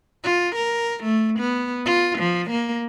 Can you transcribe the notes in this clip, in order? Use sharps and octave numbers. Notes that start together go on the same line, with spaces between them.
F4
A#4
A3
B3
F4
F3
A#3